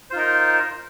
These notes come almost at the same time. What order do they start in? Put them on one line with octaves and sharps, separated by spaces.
C5 F4 D#4 A#4